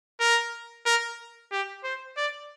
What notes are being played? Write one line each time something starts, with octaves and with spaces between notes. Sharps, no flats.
A#4
A#4
G4
C5
D5